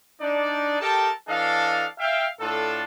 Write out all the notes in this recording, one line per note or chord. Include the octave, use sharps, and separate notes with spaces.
D4 D#4 D5
G4 A4 A#4 D#5 G5 A5
E3 D4 A4 D#5 F5
E5 F5 G5
A2 D4 F4 A4